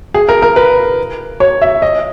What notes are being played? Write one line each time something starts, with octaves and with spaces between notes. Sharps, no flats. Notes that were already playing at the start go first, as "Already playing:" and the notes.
G#4
A#4
A#4
B4
C#5
E5
D#5